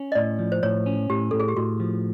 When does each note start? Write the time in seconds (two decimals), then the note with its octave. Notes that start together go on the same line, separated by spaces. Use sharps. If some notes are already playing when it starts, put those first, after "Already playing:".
Already playing: C#4
0.12 D#5
0.15 A2 D5
0.39 F3
0.52 C5
0.63 A2 C#5
0.86 C#4
1.10 A2 G4
1.31 A2 A4
1.40 G#4
1.48 G4
1.57 A2 F#4
1.80 F3